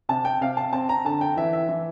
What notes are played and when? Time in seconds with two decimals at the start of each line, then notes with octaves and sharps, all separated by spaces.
0.09 C3 A5
0.25 G5
0.41 C3 F5
0.57 A5
0.73 C4 A5
0.89 A#5
1.05 D3 A5
1.21 G5
1.37 E3 E5
1.53 E5
1.69 E3